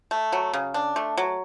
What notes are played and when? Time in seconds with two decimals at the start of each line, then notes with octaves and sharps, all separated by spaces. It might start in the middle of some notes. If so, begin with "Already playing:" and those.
0.11 A3
0.32 F#3
0.54 C#3
0.74 D4
0.96 A3
1.18 F#3